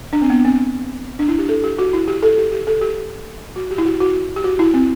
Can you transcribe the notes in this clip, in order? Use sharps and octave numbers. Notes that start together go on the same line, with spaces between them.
D4
C4
B3
C4
D4
E4
G4
A4
G4
F#4
E4
G4
A4
G4
G4
A4
G4
F#4
G4
E4
F#4
F#4
G4
F#4
E4
C4